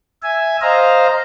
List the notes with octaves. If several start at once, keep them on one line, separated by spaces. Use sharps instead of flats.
E5 G#5
C5 D#5 F5 A#5